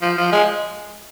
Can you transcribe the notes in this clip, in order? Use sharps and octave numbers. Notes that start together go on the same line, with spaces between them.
F3
F3
G#3